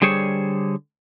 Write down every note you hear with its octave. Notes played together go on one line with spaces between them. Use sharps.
D3 G3 G#4 C5 C#5